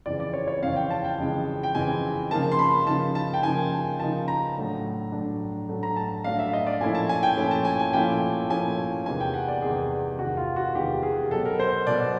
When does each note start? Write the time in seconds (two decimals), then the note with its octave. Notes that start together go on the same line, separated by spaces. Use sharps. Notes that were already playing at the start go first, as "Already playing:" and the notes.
0.06 F2 C#3 E3 G#3 C4 D5
0.20 D5
0.33 C#5
0.48 C#5
0.62 F2 C#3 E3 G#3 C4 F5
0.76 G5
0.91 A5
1.04 G5
1.18 F2 C#3 E3 G#3 C4
1.63 G5
1.75 F2 C#3 E3 G#3 C4 G#5
2.31 C#3 F3 A#3 D#4 A5
2.52 C6
2.59 B5
2.87 C#3 F3 A#3 D#4 A5
3.15 A5
3.33 G5
3.43 C#3 F3 A#3 D#4 G#5
4.00 C#3 F3 A#3 D#4 A5
4.28 A#5
4.56 A2 F#3 A3 D4
5.12 A2 F#3 A3 D4
5.69 A2 F#3 A3 D4
5.83 A#5
5.96 A5
6.24 A2 F#3 A3 D4 F5
6.39 E5
6.53 D#5
6.67 D5
6.81 A#2 F3 A3 C#4 E4 G#5
6.95 A5
7.09 G#5
7.23 G5
7.37 A#2 F3 A3 C#4 E4
7.51 A5
7.65 G#5
7.79 G#5
7.93 A#2 F3 A3 C#4 E4 G5
8.49 A#2 F3 A3 C#4 E4 G#5
9.06 E2 C3 D#3 G#3 G#5
9.20 G5
9.34 F#5
9.48 D5
9.62 E2 C3 D#3 G#3 G#4
10.18 E2 C3 D#3 G#3 F#4
10.37 F4
10.56 F#4
10.75 E2 C3 D#3 G#3 G4
11.03 G#4
11.31 B2 F#3 B3 A4
11.45 A#4
11.59 C5
11.87 B2 F#3 B3 D5